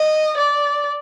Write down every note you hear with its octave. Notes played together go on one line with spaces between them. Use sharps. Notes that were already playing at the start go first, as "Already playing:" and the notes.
Already playing: D#5
D5